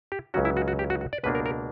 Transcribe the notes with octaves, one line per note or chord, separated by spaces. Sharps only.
G4
C#2 C#3 F#3 C#4 F#4
E4
F#4
F#4
G4
F#4
F#4
D5
C#2 B2 A#3 D4 B4
A#4
A#4